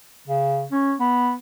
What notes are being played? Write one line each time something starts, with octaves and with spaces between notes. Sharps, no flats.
C#3
C#4
B3